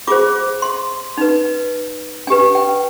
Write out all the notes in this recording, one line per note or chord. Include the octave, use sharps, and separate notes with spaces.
F4 G#4 C5 D6
C6
D#4 B4
D4 G4 B4 G#5
G5